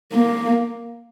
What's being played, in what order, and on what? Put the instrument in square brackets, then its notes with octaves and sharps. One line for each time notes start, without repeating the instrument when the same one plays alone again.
[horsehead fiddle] A#3